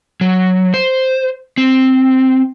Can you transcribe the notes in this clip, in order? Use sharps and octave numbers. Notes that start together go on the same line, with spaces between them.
F#3
C5
C4